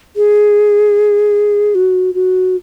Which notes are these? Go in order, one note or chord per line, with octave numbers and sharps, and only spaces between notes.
G#4
F#4
F#4